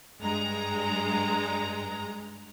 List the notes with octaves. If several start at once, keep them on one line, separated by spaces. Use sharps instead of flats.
G2 G#3 A#5